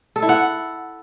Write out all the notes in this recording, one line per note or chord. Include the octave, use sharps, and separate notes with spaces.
A4
E4
F#5